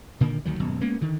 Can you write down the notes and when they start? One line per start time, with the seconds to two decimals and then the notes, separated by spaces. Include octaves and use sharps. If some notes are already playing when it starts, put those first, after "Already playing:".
0.20 A#2 D3 D#3 A#3
0.45 D2 D#3 F#3
0.60 D#1 G#1 F#2 B2
0.81 G#3 A#3 B3 C#4
1.01 D3 D#3